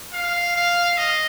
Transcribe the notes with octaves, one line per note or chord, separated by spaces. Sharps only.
F5
F5
D#5